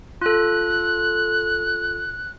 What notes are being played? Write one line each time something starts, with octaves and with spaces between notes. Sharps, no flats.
F4 A4 F#6